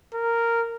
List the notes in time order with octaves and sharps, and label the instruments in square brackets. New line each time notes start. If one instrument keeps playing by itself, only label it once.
[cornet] A#4